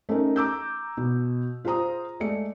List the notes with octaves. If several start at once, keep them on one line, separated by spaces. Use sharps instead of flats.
A3 C#4 D#4 A#4
A#5 D6 E6 G6
B2
F4 G#4 C5 A#5 D#6
G#3 A3 D5 C#7